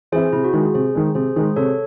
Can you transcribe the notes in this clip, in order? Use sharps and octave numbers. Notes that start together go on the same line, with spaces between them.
E3 C4 E4 G#4 C5
C3 E4
F#4
D#3 G#3 G#4
C3 G#4 C5
D#3 G#3
C3 G#4 C5
D#3 G#3 G#4 C5
C3 A4 C#5